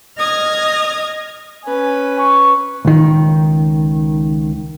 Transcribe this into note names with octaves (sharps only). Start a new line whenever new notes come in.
D#5 D#6 F6 G#6
C#4 B4 G#5
C#6
C#2 D#3